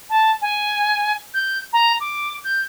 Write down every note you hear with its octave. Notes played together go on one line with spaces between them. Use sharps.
A5
G#5
G6
A#5
D6
G6